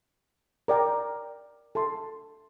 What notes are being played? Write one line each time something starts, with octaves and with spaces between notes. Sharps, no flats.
A#4 D5 G5 A#5
A4 E5 A5 C6